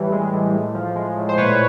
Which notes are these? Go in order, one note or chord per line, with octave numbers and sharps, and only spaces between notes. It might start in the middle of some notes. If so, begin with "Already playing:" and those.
Already playing: A2 E3 G3
G#3
A2
A2
F3
G#3
A2
C5
A#2 B4 C#5